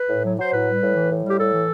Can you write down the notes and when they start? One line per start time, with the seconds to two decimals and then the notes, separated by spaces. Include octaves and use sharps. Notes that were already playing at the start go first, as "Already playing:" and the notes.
Already playing: B4
0.09 A2
0.23 F#3
0.37 F#3 C5
0.52 A2 B4
0.66 G3
0.81 A2
0.96 E3
1.10 A2
1.24 G3
1.29 G4
1.38 A2 A4
1.54 E3